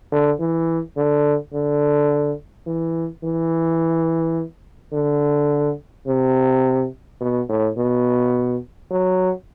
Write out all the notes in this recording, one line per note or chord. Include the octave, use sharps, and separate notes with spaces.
D3
E3
D3
D3
E3
E3
D3
C3
B2
A2
B2
F#3